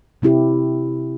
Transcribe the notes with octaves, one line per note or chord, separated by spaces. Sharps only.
C3 C4 E4 G4